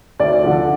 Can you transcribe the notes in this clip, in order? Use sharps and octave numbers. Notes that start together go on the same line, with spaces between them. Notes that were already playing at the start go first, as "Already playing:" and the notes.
D2 D5
D3 F3